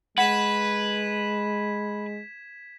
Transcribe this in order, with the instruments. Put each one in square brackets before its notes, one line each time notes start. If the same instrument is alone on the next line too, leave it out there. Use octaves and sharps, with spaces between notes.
[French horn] G#3 [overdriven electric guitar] B4 [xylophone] F#5 [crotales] G#6 B6 E7